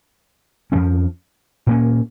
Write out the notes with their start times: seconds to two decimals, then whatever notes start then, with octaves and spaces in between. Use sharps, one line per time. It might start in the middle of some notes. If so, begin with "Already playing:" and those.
0.72 F2 F3 G#3 C#4
1.67 A#2 A#3 C#4